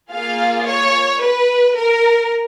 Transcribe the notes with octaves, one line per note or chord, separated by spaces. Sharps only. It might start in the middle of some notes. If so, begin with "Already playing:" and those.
A#3 F4 G#4 F5
C#5
B4
A#4